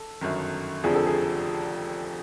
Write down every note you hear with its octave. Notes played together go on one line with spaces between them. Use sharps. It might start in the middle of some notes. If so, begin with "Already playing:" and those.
Already playing: A4
G1 F#2 D#3
F1 F2 D3 F3 G#4
A4
G#4